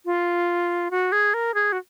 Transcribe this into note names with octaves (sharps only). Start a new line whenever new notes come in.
F4
F#4
G#4
A#4
G#4
F#4